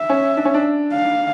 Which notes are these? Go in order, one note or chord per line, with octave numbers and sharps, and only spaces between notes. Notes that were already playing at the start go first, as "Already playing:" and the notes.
Already playing: E5
C#4
D4
C#4
D4
F5